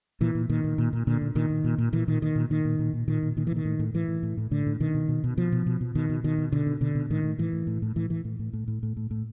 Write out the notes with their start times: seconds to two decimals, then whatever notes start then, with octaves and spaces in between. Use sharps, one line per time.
0.21 A#2 E3
0.35 A#2
0.49 A#2 D#3
0.64 A#2
0.78 A#2
0.93 A#2
1.07 A#2 D3
1.21 A#2
1.35 A#2 D#3
1.50 A#2
1.64 A#2
1.78 A#2
1.93 A#2 E3
2.08 A#2 D#3
2.22 A#2 D#3
2.36 A#2
2.50 A#2 D#3
2.65 A#2
2.79 A#2
2.93 A#2
3.08 A#2 D#3
3.23 A#2
3.37 A#2 D#3
3.47 E3
3.51 A#2 D#3
3.65 A2
3.79 A2
3.94 A2 E3
4.08 A2
4.23 A2
4.37 A2
4.51 A2 D3
4.67 A2
4.80 B2 D#3
4.95 B2
5.09 B2
5.24 B2
5.37 B2 F3
5.52 B2
5.66 B2
5.81 B2
5.95 B2 D#3
6.10 B2
6.24 B2 D#3
6.38 B2
6.52 B2 D3
6.67 B2
6.81 B2 D3
6.95 B2
7.10 A2 D#3
7.24 A2
7.38 A2 E3
7.53 A2
7.67 A2
7.82 A2
7.96 A2 E3
8.10 A2 E3
8.25 A2
8.39 A2
8.53 A2
8.68 A2
8.83 A2
8.97 A2
9.11 A2